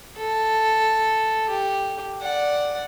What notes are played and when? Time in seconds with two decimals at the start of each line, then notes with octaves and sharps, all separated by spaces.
0.17 A4
1.49 G4
2.21 D5 F#5